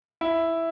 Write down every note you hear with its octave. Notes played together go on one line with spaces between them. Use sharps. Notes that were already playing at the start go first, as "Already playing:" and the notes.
E4